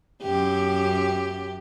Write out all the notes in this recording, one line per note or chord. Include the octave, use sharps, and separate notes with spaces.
F#2 G4